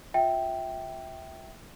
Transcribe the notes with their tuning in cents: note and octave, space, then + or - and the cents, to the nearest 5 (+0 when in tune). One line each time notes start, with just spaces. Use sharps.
F4 +30 E5 -10 G5 -5